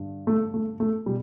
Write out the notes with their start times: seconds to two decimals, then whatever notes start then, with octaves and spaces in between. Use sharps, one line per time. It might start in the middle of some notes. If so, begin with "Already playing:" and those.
Already playing: G2 D3
0.27 A3
0.54 A3
0.80 A3
1.06 B2 G3